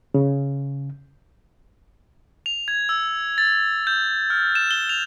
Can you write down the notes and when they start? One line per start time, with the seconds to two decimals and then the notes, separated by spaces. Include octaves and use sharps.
0.14 C#3
2.46 F7
2.68 G#6
2.89 E6
3.38 A6
3.87 G6
4.30 F6
4.55 E7
4.71 G7
4.89 F7